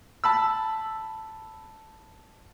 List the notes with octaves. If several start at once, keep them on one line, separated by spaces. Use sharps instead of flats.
A5 B5 E6